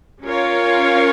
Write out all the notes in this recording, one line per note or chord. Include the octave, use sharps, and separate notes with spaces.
C#4 F4 A#4 C#5 F5